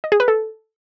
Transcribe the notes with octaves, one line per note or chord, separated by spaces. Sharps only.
D#5
G#4
B4
A4